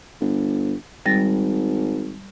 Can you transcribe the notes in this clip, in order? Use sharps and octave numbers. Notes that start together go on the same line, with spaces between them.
G1
G#1 G3 A6 A#6